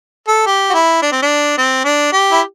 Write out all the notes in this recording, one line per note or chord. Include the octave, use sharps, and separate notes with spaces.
A4
G4
F#4
E4
D4
C4
D4
C4
D4
G4
E4